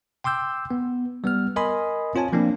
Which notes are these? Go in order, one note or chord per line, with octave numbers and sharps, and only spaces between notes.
G5 C6 D6 E6 G6
B3
G3 B3 F6
A#4 D#5 G#5 B5 C6 D#6
C4 F4 C#5 G#5 A5
F3 A#3 C4 D4